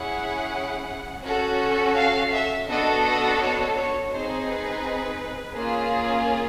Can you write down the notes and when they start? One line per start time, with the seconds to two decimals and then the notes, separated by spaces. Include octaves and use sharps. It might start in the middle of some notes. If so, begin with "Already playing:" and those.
Already playing: C#4 E4 G#4 F#5
1.24 C#4 F#4 A4
1.97 F5
2.33 E5
2.68 B3 D4 F#4 A4 D#5
3.05 D#5
3.41 C#5
3.77 C#5
4.13 C4 D#4 G#4 C5
4.48 B4
5.56 A#3 C#4 F4 G#4